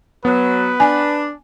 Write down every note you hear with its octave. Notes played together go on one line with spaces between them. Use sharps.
F#3 B3 B4
D4 G#5